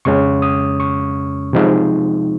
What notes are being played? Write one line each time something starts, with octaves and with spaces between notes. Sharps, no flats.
F2 C#3 G#3 C#4 C#6
D#6
C#6
C3 F3 G#3 D#4